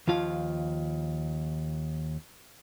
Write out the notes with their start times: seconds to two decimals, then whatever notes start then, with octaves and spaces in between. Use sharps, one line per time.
0.08 D#2 F3 F4 F5